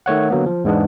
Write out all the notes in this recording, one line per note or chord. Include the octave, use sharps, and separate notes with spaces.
D#3 A3 C#5 F#5
D3 F#3 A#3 B3
F3
E2 G#2 G#3 B3 D4